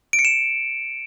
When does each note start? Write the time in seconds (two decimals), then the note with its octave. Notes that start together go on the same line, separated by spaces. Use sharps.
0.13 D7
0.19 C#7
0.25 E7